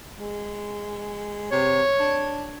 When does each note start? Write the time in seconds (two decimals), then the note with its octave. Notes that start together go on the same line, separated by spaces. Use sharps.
0.20 G#3
1.51 C3 C#5
2.00 D4